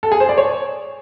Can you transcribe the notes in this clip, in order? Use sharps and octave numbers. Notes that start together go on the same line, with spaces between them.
A4
G#4
C5
D5
C#5